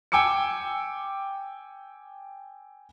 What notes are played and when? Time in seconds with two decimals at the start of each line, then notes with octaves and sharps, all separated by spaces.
0.12 G5 G#5 D6 E6 C#7